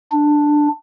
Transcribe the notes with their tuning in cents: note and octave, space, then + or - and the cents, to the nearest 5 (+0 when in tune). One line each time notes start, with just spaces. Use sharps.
D4 +10